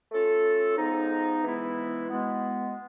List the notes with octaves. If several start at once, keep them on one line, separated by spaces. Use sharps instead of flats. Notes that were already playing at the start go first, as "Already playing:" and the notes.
A3 C#4 F4 A4
F3 G#3 B3 D#4
E3 G#3 B3 E4
B2 G#3 B3